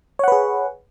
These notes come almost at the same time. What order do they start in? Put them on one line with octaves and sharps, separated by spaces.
C#5 F#5 B4 G#4